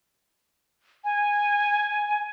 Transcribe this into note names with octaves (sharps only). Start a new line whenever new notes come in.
G#5